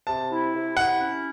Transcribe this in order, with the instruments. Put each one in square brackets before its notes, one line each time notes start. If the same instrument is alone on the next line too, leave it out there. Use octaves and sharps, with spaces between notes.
[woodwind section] C3 [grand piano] A5
[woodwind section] E4
C3
[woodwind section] E4 [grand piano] F#5
[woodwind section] C#4